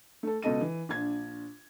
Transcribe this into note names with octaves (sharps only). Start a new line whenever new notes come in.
A3 A4
C#2 B2 A4 D#5 D#7
E3
A#1 D4 G#6